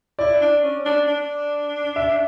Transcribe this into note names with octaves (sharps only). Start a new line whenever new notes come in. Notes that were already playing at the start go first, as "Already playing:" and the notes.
E4 D5
D4
C#4
D4
D4
E5